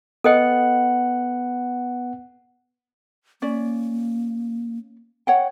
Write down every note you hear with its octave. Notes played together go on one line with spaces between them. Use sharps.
B3 A4 D#5 F#5 G5
A#3 C#4 D5
C#5 F#5 G5